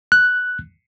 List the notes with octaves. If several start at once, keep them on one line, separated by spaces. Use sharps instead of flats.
F#6